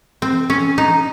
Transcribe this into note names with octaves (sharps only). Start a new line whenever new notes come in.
C4
C#4
D#4